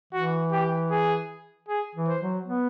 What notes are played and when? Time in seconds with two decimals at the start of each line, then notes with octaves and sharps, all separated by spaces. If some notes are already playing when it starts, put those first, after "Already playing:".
0.13 E3 F#4
0.52 G4
0.91 G#4
1.69 G#4
1.95 E3
2.08 C5
2.21 F#3
2.47 B3